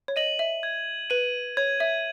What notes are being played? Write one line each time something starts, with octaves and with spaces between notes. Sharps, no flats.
C#5
D#5 D#7 F#7
E5
G#6
B4 D#7 F#7
C#5 G#6
E5